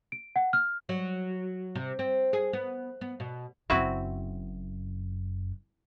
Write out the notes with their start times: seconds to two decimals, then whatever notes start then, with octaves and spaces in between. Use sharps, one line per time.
0.12 D7
0.36 F#5
0.53 F6
0.89 F#3
1.75 C3
1.99 C4
2.33 G#4
2.53 B3
3.01 B3
3.20 B2
3.70 F#1 F#2 C4 E4 F#4